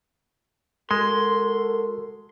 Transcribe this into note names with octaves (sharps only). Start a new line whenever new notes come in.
G#3 F#4 A4 A#4 C6